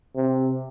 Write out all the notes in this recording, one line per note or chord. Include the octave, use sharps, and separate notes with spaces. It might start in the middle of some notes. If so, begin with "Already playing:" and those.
C3